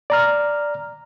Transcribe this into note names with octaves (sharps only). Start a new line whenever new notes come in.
D5 A#5 F6